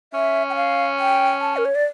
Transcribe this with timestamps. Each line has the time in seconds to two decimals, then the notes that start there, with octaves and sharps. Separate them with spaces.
0.13 C#4 E5
0.50 G5
0.56 F5
0.99 G5
1.41 A5
1.57 A#4
1.65 C#5
1.75 D5